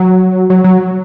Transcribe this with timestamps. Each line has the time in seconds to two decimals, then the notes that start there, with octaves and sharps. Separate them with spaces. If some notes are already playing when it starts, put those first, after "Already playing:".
Already playing: F#3
0.50 F#3
0.64 F#3